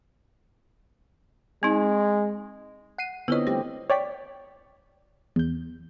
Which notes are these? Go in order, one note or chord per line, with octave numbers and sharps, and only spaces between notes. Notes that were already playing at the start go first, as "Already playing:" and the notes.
G#3 C4 D#4
F#5 C7 D#7
D3 B3 C4 E4 F4 B4 C#5 D#5
G3 A3 C4 G4
C#5 D5 G5 B6
E2 G6